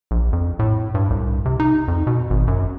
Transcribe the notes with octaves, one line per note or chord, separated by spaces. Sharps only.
A#1
F2
A2
G2
C2
C3
D#4
F2
B2
G#1
F#2